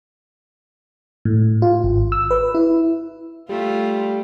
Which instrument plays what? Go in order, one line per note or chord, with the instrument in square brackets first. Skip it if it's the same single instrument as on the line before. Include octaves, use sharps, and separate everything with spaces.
[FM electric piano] A2
F4
G#1
E6
B4
E4
[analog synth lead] G3 [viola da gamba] A3 F4